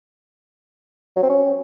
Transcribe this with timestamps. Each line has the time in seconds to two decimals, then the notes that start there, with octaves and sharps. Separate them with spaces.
1.16 F#3
1.23 C4
1.29 C#4